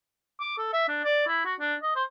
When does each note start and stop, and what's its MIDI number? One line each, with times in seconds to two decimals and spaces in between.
0.40 0.55 86
0.58 0.70 69
0.73 0.88 76
0.88 1.04 62
1.05 1.22 74
1.27 1.41 64
1.45 1.54 66
1.60 1.75 62
1.82 1.91 75
1.96 2.03 72